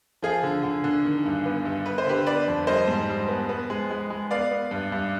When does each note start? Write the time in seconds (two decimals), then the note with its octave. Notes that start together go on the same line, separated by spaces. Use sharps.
0.22 F3 F4 G#4
0.43 D3
0.63 D3
0.84 D3
1.05 D#3
1.25 G2
1.46 B3
1.65 G2
1.86 B3 B4
1.98 C5
2.06 D3 G4 B4
2.26 B3 B4 D5
2.48 F2
2.67 G3 C5 D#5
2.87 G#2
3.09 G3
3.28 B3
3.49 B3
3.70 G#3
3.91 G#3
4.10 G#3
4.31 B3 D5 F5
4.51 B3
4.71 G2
4.92 G2